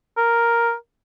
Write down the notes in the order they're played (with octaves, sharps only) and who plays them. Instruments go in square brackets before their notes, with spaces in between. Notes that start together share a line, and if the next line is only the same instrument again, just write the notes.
[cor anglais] A#4